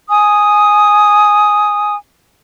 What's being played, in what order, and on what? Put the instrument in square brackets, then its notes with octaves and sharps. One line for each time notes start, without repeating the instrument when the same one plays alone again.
[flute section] G#5 D#6